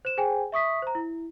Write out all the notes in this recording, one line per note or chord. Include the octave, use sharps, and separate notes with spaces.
C5 E7
G#4 C5 G5 G#5
E5 C#6 D#6 B6
C5 A#5
E4